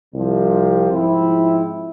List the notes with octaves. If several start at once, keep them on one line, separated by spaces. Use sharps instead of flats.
C2 C3 F3
G#2 F3 C4 E4